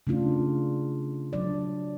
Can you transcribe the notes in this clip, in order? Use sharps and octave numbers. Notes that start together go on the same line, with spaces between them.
C#3 A3 D4 F4
F#3 D4 D5